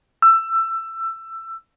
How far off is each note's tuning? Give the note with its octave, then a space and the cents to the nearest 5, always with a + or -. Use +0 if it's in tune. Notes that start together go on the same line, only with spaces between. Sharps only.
E6 +20